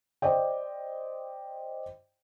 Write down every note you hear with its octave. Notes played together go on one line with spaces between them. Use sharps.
C5 D5 D#5 G5